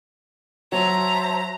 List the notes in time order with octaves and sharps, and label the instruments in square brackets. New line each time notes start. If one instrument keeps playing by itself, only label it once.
[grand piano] F#3 [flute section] C5 E5 A5 [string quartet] A#5